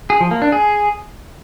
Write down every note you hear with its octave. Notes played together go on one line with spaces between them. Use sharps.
G#4
F3
A#3
D4
G#4